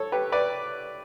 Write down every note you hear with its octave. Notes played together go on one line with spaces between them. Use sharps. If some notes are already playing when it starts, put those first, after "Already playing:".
Already playing: A4 C#5
G4 B4
B4 D5